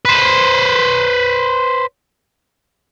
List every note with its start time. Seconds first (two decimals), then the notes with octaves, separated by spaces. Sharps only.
0.05 B4 C5